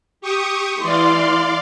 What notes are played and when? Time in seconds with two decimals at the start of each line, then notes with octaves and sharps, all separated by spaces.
0.21 G4 C#6 D#6
0.82 E3 E4 D5 F5 C6